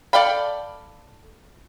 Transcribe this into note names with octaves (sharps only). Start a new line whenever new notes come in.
A4 D5 F5 G5 B5